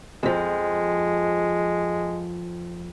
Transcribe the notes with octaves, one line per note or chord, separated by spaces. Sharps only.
F2 F3 G#3